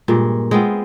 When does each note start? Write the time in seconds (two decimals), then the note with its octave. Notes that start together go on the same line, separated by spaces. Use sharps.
0.08 G2 A#2 G#3
0.51 G#3 B3 C4 F4